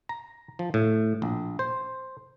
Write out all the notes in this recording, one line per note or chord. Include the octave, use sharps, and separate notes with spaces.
A#5
F3
A2
A#1
C5